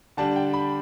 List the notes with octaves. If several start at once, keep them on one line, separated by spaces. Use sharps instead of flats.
D3 G3 D4 A5
G5
B5